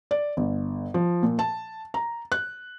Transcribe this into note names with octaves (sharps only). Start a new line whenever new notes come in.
D5
G1
F3
A#2
A5
A#5
F#6